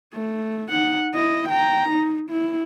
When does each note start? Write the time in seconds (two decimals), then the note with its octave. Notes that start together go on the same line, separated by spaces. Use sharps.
0.14 A3
0.69 D#4 F#5
1.14 E4 D#5
1.49 G5 A#5
1.89 D#4
2.30 E4